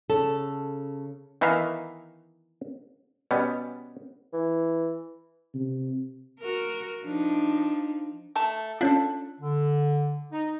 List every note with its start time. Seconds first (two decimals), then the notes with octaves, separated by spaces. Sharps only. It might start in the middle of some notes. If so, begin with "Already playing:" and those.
0.10 C#3 A4
1.41 D#3 E3 B3 D#4 E5 F5
3.31 B2 G3 B3 C#4
4.33 E3
5.55 C3
6.40 F#4 A#4
7.03 F3 D4 D#4
8.36 A3 A5
8.81 C#4 D4 F4 A4
9.40 D3
10.32 D#4